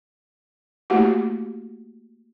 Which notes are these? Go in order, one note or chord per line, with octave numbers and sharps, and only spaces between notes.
A3 A#3 E4 F#4 G4 F#5